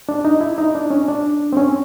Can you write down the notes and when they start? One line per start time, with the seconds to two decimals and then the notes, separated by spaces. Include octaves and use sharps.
0.09 D4
0.25 D#4
0.41 E4
0.58 D#4
0.75 D4
0.90 C#4
1.08 D4
1.53 C4
1.57 C#4